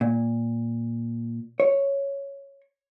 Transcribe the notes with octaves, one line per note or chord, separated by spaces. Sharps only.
A#2
C#5